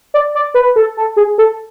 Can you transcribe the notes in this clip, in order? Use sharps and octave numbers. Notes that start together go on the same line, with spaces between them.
D5
D5
B4
A4
A4
G#4
A4